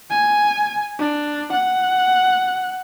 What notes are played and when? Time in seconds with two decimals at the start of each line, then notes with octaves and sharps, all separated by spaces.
0.10 G#5
0.99 D4
1.53 F#5